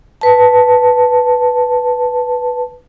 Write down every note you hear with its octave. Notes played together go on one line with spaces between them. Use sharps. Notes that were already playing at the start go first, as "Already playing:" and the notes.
B4 A5